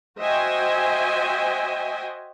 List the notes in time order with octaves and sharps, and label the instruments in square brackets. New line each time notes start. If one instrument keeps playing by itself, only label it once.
[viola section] F#4 C5 D#5 E5 G5 G#5